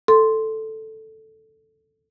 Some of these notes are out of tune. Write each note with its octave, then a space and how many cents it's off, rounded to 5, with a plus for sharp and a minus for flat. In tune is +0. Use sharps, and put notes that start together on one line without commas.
A4 +0 C6 +0